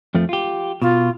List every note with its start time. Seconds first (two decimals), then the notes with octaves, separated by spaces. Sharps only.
0.15 F2 F3 A3
0.29 F4 G4
0.82 B2 F4